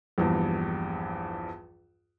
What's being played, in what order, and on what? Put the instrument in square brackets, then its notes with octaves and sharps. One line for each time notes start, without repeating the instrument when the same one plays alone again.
[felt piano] A#1 E2 G2